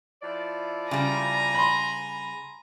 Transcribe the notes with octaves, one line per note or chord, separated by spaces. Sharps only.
F3 E4 D5
C#3 G3 G#5 A#5
B5 C6